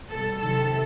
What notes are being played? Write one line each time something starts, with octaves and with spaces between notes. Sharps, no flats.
B2 G3 A4
C3 D#3 F#3 A4